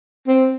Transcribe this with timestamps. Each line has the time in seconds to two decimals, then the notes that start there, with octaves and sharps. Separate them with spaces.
0.27 C4